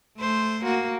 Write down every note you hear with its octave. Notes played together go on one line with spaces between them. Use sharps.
A3 C5
A#3 F#4